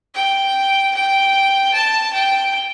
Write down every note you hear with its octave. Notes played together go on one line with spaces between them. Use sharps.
G5
G5
A5
G5